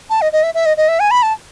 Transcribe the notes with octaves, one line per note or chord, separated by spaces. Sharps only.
A5
D#5
D#5
E5
E5
D#5
D#5
E5
G#5
B5
A5